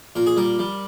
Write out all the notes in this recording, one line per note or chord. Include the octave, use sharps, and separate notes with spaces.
A#2 A#4
G#4
G3 A#4
G3